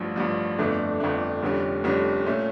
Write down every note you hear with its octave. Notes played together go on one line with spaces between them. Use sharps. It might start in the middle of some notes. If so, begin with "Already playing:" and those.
Already playing: A1 G2 F3
A1 G2 F3
G1 F2 D3 A3 D4
G1 F2 D3 A3 D4
F1 F2 D3 G3 C#4
F1 F2 D3 G3 C#4
A#2 A3 C#4